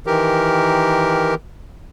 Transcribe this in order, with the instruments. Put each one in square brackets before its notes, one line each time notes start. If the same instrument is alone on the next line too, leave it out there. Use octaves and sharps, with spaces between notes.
[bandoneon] D#3 E3 G4 A#4